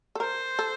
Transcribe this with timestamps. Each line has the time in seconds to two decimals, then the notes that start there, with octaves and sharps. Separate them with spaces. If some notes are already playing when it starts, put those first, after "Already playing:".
0.15 A4
0.20 A#4 C5
0.59 A4